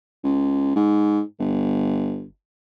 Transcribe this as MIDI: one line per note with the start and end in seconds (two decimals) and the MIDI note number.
0.24 0.74 37
0.76 1.21 44
1.39 2.25 31